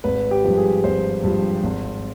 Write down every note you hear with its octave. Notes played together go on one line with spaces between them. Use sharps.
G#1 B4
G4
G2 F3
G#4
G#1 C5
G2 F3
G#1